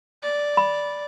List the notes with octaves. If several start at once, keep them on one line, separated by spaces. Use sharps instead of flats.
D5
B5